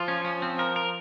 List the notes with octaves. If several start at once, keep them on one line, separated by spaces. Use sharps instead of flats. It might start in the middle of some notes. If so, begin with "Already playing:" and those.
Already playing: F3 F4
C#4
C#4
C4
A#4
A#4